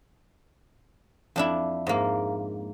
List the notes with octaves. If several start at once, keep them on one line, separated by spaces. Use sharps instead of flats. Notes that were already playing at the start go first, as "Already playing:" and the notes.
F2 D4 E4
G#2 A#3